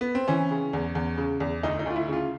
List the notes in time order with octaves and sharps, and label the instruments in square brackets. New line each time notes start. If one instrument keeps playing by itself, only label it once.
[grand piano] B3
C4
[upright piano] E3 [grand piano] C#4
[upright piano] C#3
E2
E2
C#3
E2
[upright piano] D2 [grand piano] D#4
[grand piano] D#4
[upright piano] D2 [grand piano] F4
[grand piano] E4
[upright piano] C#3 [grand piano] F4